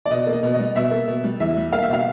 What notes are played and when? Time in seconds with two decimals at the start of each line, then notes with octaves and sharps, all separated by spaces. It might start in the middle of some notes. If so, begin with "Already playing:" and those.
0.06 D5
0.10 B2 D#5
0.27 A#3
0.33 D#5
0.43 B2
0.54 D#5
0.59 G3
0.75 B2 E5
0.91 A#3
1.08 B2
1.24 G3
1.40 E2 E5
1.56 G3
1.72 A#3 F5
1.82 E5
1.89 B2 F5